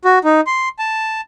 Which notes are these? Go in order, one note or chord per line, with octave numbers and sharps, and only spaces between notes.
F#4
D#4
C6
A5